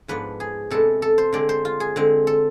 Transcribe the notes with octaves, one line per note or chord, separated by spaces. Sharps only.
G#2 F3 B3 D4 B4
G#4
C3 G#3 B3 D4 A4
A4
C5
D3 G#3 C4 D5
C5
F4
G#4
D3 G#3 C4
A4